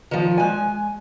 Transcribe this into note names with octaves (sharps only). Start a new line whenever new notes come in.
D#3 F3
G#3 G#5